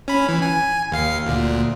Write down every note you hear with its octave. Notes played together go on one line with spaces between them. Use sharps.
C#4 B5
E3
G#5
D#2 F5 C7
D2 A#2